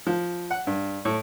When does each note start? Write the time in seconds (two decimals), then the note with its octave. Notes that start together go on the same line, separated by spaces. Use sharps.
0.07 F3
0.51 F#5
0.67 G2
1.05 A2